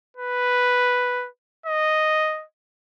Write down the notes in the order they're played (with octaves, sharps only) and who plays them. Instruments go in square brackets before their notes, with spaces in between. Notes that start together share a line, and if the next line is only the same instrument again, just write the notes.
[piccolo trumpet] B4
D#5